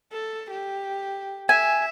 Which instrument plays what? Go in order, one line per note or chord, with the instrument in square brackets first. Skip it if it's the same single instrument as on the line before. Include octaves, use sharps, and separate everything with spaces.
[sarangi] A4
G4
[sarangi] E5 [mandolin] G#5